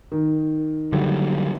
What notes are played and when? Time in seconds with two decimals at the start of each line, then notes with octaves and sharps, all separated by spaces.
0.12 D#3
0.92 D3 F#3 G3